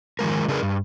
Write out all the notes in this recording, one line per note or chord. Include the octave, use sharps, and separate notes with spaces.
D#3 F3 G#3 A#4
C#3 D4 G#4 A#4 B4
G2